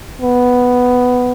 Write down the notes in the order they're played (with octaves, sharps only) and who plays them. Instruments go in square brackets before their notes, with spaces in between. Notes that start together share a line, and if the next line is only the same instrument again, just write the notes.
[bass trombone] B3